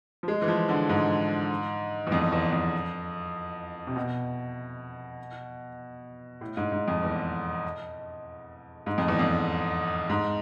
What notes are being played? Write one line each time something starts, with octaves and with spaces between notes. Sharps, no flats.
F3
G#3
E3
F3
D3
G#2
E2
F2
E2
F2
C3
B2
A2
G#2
G#2
F2
E2
G#2
F2
E2
F2
G#2